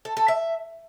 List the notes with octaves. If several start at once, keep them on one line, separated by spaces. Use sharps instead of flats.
A4
A4
E5